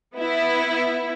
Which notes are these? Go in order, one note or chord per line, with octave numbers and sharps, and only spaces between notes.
B3 E4